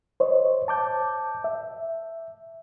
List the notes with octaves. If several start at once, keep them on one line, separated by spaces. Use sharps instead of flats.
C5 C#5 D#5
A5 D6 G6
E5